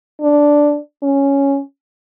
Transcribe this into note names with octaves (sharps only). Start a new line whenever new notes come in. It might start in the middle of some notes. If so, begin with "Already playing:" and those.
D4
C#4